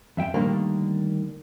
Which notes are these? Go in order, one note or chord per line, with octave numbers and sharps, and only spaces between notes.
F2 E5 G5
D3 D#3 G3 A3 A#3 D4